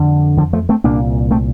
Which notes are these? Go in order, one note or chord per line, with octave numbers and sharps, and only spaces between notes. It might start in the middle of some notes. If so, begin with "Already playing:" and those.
Already playing: F2 D3
D3 F3
F3 A3
A3 C4
C2 A#2 A#3 D4
A3 C4